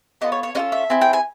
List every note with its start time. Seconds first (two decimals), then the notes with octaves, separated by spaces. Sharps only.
0.21 B3 D4 F4 A4 D#5
0.32 C#5
0.43 C#5
0.55 C#4 F4 A4 D#5
0.72 E5
0.90 C4 E4 G#4
1.02 G5
1.13 G#5